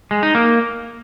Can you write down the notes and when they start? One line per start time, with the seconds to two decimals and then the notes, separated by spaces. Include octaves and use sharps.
0.11 G#3
0.23 D#4
0.35 A#3